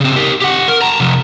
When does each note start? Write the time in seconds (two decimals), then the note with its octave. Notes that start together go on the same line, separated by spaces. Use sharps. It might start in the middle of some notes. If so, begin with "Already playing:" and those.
0.01 C#3 C4
0.16 G4 A#4
0.41 G4 F#5
0.68 A#4
0.82 A5 A#5
1.00 C3 F3